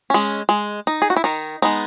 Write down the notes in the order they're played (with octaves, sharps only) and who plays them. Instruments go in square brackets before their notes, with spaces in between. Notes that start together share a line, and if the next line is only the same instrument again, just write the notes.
[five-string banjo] G#3 C#4
G#3
D#4
G#4
F#4
E4
D#3 D#4
G#3 B3 D#4